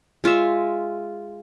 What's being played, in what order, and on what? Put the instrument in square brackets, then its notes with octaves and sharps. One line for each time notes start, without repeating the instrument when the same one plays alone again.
[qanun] G#3 F4 C#5 E5